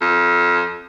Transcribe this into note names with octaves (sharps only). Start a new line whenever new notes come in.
F2